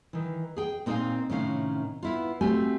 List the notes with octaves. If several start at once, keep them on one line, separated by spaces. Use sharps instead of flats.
D#3 E3
G#4 G5
A#2 C4 D#4 D5 F5 G#5
A2 C3 D#3 C#4 F5
B3 E4 F4
A3 C4 F#4 G4 G#5